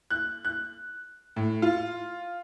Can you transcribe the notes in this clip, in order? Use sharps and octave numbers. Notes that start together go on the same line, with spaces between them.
F#6
F#6
A2
F4